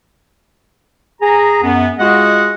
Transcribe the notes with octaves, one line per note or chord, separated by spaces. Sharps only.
G#4 A#5
F#2 B3
G#3 F4 F#4 G#4 D#5 F#5